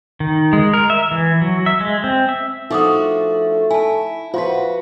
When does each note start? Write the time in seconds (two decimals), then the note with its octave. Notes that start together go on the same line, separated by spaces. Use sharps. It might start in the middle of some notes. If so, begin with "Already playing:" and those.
0.20 D#3
0.53 G#3
0.74 A#4
0.90 E5
1.11 E3
1.41 F#3
1.66 E5
1.81 G#3
2.04 C4
2.29 E5
2.71 F3 A3 D4 D#4 F#4 D6 D#6
3.70 E4 G#5 A5
4.34 F3 F4 F#4 B4 C6